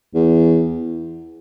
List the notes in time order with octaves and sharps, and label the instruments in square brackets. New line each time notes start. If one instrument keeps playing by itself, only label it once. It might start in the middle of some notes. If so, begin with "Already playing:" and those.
[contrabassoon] E2